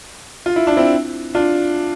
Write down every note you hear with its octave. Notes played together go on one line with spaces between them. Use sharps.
F4
E4
D4
C4 E4
D4 F4